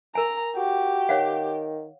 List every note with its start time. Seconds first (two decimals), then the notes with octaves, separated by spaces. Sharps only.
0.15 A#4 G#5 A#5
0.56 F#4 G4
1.09 D#3 C#5 F5 F#5